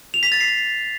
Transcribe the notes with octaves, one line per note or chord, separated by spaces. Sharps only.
F7
B6
A6
C7